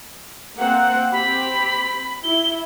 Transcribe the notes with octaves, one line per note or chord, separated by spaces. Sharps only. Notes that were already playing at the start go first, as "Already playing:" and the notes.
A#3 C4 F#5
C4 G4 B5
E4 G7